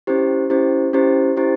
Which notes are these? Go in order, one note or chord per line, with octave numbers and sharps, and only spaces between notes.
C#4 E4 G4 C5
C#4 E4 G4 C5
C#4 E4 G4 C5
C#4 E4 G4 C5